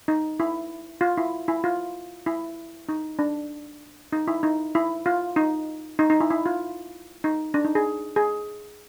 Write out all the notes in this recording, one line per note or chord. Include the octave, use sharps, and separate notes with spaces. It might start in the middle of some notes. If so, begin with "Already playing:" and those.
D#4
E4
F4
E4
E4
F4
E4
D#4
D4
D#4
E4
D#4
E4
F4
D#4
D#4
D#4
E4
E4
F4
D#4
D4
D#4
G#4
G#4